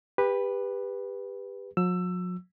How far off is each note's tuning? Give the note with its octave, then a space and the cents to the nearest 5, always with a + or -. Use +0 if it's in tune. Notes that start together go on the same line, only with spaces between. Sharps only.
G4 +25 B4 -5
F#3 -45 E6 +15